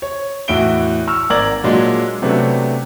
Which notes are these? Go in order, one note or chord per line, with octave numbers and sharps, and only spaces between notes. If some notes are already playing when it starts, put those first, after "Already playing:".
C#5
E2 A2 F#4 E5 D7 G7
C#6 E6 F6
G#1 A#4 D5 A#5 G#6 F#7
A#2 F#3 G#3 D4 F#4
C3 F#3 A3 B3 C#4 D4